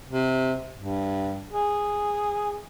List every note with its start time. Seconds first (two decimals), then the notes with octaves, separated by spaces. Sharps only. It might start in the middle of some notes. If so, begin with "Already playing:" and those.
0.10 C3
0.78 G2
1.51 G#4